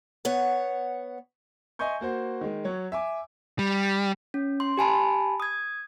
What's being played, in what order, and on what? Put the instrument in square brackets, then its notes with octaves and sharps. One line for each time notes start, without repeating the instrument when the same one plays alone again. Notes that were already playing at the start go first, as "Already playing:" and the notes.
[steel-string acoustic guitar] B3 C#5 F#5
[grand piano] D#5 E5 G#5 C6 C#6 G6
A#3 F#4 C5
D#3 G#3
F#3 C#5
E5 G#5 D6
[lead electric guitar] G3
[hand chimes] C#4
C6
G4 G#5 A5 B5
D#6 G#6